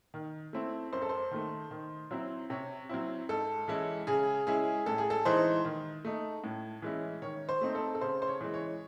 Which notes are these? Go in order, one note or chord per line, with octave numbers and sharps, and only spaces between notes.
D#3
A3 C4 E4
F#2 C5
A4
C5
D#3 A3
D#3
F#3 C4 E4
C3 C#5
F#3 C4 E4
G#2 A4
E3 G#3 C#4 E4
C#3 G#4
G#3 C#4 E4 G#4
A2 A4
G#4
A4
E3 G#3 D#4 C5
D#3
A3 D#4
A2
E3 G#3 C#4 E4
D#3 C#5
C5
A3 C4 D#4
A4
A4
C#3 C5
C5
C#5
E3 G#3
C#5